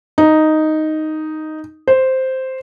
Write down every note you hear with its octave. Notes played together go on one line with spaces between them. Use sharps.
D#4
C5